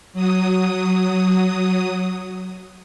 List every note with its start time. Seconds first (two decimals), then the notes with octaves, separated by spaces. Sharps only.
0.13 F#3 D#6